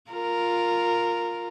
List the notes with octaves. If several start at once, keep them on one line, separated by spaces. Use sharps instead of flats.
F4 A#4